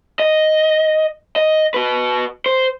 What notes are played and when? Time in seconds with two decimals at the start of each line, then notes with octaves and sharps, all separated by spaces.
0.19 D#5
1.36 D#5
1.74 F#4 B4
2.46 C5